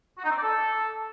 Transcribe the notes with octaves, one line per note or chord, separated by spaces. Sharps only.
F#4
D#4
C4
D5
A4